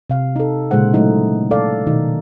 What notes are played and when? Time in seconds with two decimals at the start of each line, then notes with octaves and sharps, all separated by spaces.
0.10 C3 F5
0.36 D#4 A4
0.71 A#2 C#3 G#3 C5 F#5
0.93 F#3 A3 A#3 D#4 E4
1.51 A4 D5 F5
1.87 B2 D#3 D#4